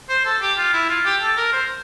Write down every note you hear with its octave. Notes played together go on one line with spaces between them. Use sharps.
C5
A4
G4
F4
E4
F4
G4
A4
A#4
C5